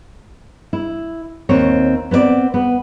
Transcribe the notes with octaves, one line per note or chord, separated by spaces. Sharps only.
E4
D#2 C4 C#5
B3 C4 A#4 D5
B3